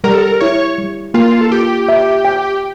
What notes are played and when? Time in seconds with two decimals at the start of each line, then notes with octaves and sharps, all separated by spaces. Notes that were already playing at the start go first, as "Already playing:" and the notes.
0.04 G3 A#4
0.14 A4
0.22 A#4
0.40 E4 C#5
0.78 G3
1.14 A#3 F4
1.41 A4
1.51 F4 G4
1.89 E5
2.25 G5